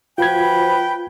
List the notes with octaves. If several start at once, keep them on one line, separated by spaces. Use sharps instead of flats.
F3 F4 F#4 B4 C5 G5 G#5 G#6